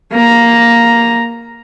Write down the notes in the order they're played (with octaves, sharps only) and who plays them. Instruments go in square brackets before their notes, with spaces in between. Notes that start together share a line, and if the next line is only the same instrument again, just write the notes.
[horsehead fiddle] A#3 A#5